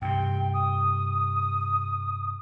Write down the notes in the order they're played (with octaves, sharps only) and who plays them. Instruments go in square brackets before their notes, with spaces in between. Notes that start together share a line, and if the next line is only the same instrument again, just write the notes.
[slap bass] G2 C3 [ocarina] G5
[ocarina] D#6